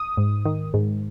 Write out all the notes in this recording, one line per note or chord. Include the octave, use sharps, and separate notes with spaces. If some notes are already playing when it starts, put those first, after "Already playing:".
Already playing: D#6
G#2
D#3
G#2